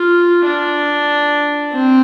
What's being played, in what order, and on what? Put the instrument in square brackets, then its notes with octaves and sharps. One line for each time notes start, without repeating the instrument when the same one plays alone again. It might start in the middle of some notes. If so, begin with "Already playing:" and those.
Already playing: [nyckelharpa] F4
D4
C4